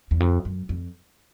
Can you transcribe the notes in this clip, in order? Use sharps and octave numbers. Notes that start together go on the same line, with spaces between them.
E2
F2
F#2
F2